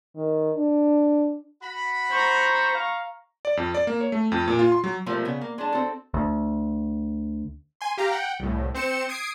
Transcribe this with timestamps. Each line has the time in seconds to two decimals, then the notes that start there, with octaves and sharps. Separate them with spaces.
0.15 D#3
0.55 D4
1.63 F#4 F#5 B5
2.11 C5 A#5 C#6
2.75 F5
3.45 D5
3.57 F2
3.74 D5
3.87 A#3
4.01 C#5
4.12 A3
4.32 F2
4.48 A#2
4.59 F4
4.72 C6
4.84 F#3
5.06 B2 F3 G3 A3 A#3
5.25 C#3 B3
5.41 A#3
5.58 G#3 D4 A5
5.72 C4 F#4 A4
6.14 D2
7.81 G#5 C6
7.98 G4 F5 A#5
8.11 F#5 G5
8.40 C2 A2
8.75 C4 C5 C#7 E7
9.09 D#6 G#6 C7 D7